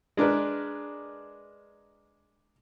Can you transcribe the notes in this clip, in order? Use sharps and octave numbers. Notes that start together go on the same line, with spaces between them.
G#3 D4 A#4 B4